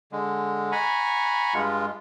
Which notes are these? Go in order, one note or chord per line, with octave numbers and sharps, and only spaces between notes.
D3 G#3
F#5 G#5 A#5 B5 C#6
G2 G#3 F4